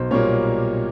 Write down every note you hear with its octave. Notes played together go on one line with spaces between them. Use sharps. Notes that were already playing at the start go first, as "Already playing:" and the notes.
Already playing: B1 C5
A#2 G3 A#3 C#5